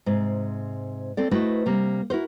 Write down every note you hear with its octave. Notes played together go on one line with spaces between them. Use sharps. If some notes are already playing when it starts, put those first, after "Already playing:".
G#2 C3
C4 A4 D5
A3 E4 F#4 B4 C5 D#5
C3 G3 A#3
E4 F#4 A#4 C5